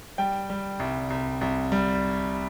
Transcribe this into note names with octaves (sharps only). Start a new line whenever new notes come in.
G3 G5
G3
C2
C2
C2
G3